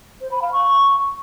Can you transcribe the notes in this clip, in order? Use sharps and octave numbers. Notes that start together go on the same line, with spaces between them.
C5
B5
F5
C#6